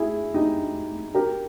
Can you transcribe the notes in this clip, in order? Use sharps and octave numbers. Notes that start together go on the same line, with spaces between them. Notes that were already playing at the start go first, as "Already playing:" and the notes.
Already playing: E4 G4 G#4
D#4 G4
G4 A#4